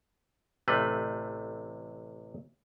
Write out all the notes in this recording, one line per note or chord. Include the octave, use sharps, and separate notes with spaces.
A1 C3 A3 B4